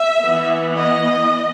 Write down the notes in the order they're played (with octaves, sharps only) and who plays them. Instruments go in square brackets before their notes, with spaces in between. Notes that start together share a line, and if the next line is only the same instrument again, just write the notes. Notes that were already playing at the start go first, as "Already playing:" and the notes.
Already playing: [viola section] E5
E3 B3
D#5